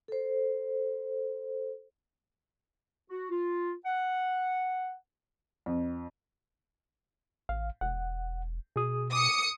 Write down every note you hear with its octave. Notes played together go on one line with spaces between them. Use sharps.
A4 C5
F#4
F4
F#5
F2
A1 F5
E1 F#5
B2 G#4 D#6
D6 D#6 C#7